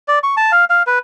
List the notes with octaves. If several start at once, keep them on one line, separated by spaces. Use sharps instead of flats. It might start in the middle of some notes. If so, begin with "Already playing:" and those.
D5
C#6
A5
F5
F5
B4